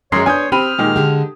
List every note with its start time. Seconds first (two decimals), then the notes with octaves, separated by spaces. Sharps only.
0.12 F#2 F#3 G#3 C#5 A#5 C6 D#6 C7
0.26 B3 D4 C#5 G#5 C6 D#6 G6
0.52 C4 G4 B5 F6 D#7
0.78 A#2 D#3 G#3
0.96 D3 G#3 G4